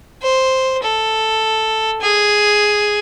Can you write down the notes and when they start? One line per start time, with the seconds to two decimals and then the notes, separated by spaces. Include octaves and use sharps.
0.23 C5
0.83 A4
2.02 G#4